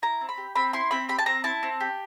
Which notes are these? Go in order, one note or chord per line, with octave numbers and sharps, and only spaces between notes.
E4 A#5
C4
B5
G4
C4 B5
E4 C6
C4 B5
G4 B5
A5
C4 A#5
E4 A5
C4
G4